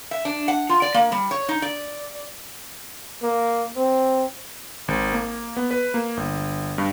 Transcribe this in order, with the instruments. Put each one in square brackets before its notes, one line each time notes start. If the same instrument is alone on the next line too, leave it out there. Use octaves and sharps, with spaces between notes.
[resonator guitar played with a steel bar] E5
D4
F#5
F4
D5
A#3
G3
C#5
D#4
D5
[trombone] A#3
C4
[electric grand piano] G#1
A#3
B3
B4
A#3
G1
G2